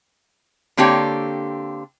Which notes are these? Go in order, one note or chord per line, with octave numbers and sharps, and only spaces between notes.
D3 A#3 C4 D4 G4 C#5